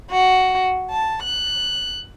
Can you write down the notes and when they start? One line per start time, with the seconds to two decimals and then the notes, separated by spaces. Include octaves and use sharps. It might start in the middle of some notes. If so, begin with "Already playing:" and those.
0.11 F#4
0.91 A5
1.24 F#6